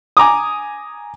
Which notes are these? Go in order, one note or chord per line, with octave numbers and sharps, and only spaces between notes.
G#5 A#5 D6 D#6